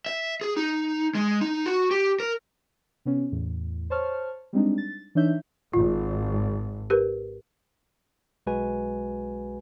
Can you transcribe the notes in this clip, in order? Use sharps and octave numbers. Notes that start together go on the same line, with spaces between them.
E5
G#4
D#4
G#3
D#4
F#4
G4
A#4
C3 B3 C#4
E2 A2
C5 C#5 A5 C#6 F6
G3 G#3 C4 D4 D#4
A6
E3 D4 D#4 C#5 E5 G6
G#1 F4
G4 A#4 B4
B1 G#3 F#4 B4 G#5